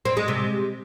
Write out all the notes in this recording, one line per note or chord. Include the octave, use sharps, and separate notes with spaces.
C4
G#3
C3